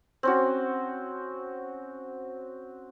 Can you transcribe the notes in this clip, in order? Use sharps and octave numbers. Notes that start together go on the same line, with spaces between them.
C4 C#4 F#4